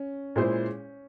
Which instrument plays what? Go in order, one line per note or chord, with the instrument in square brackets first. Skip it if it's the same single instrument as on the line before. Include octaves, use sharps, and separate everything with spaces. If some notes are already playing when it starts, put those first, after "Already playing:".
Already playing: [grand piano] C#4
[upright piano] A#2 G#3 E4 G#4 C5